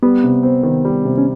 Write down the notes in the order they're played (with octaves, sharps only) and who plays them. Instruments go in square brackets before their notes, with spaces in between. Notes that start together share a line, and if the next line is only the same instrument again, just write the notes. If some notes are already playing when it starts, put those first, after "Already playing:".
[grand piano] G3 [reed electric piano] B3
[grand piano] C3
C4
D#3
G3
C3
[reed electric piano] C#4